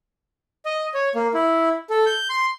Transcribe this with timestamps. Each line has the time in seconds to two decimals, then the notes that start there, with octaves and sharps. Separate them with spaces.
0.66 D#5
0.94 C#5
1.15 A#3
1.34 E4
1.90 A4
2.06 G6
2.30 C6